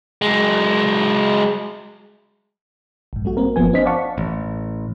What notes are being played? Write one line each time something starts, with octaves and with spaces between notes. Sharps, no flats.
F#3 G#3
A#1 G#2
G3 A3 F#4
A#3 C4 A#4
G1 F3 B3 G#5
C4 D4 C5 D#5 B6
D5 F5 F#5 A5 C#6
A1